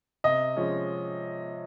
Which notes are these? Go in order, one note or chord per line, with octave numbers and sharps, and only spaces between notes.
C3 D#5
F3 G#3 C#4